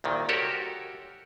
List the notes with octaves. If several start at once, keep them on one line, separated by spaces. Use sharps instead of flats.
C2 A#2 D#3
F#4 G4 A4 A#4 C#5